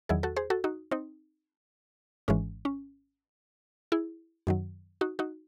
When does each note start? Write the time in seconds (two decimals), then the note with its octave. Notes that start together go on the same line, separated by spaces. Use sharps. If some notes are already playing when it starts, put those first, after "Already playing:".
0.09 E2 D#3 F#3 E4 G#4
0.23 F#4 A4
0.36 G#4 C5
0.50 F#4 A4
0.64 D#4 F#4
0.91 C4 D#4
2.28 G#1 G#2 E3 G#3 C#4
2.65 C#4
3.92 E4 G#4
4.47 F#2 D#3 F#3
5.01 D#4 F#4
5.19 D#4 F#4